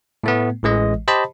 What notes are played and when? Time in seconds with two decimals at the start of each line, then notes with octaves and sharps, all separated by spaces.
0.23 A2 A3 B3
0.63 A1 E3 G#3 D#5
1.08 G4 C5 D#5 A5 B5